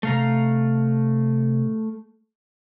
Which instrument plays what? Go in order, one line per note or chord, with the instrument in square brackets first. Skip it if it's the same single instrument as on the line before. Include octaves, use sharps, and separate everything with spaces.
[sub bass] C3 [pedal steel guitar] A3 F5 A#5